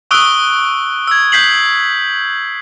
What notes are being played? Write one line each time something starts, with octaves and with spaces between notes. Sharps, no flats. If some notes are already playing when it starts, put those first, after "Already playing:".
C#6 D#6 E6 F#6 D7 G7
E6 G#6
G6 B6 C7 F#7